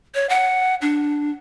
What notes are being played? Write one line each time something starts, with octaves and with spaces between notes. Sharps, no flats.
C#5
F#5
D4